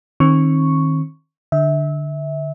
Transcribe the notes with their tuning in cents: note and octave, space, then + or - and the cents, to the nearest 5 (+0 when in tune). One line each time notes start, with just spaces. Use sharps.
D#3 +0 C4 +40 C#6 +0
D3 +10 E5 -25